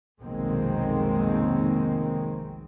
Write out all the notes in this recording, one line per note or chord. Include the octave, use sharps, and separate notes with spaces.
F1 B1 D#3 G#3 A#3 C4